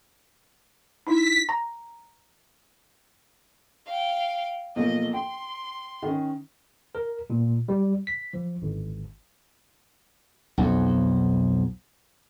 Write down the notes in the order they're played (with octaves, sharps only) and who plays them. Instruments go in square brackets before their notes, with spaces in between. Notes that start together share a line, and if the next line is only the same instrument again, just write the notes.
[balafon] D#4 E4 [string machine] B6
[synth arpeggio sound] A#5
[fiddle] F5 G5
[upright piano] B1 F3 A#3 [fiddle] D#5
[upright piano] G5 [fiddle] C6
[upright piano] D#3 C#4
[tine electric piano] A#4
A#2
G3
B6
F3
G#1
[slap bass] B1 F2